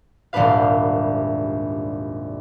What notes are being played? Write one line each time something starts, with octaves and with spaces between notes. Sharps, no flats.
D#1 C2 G#2 D4 B4 F5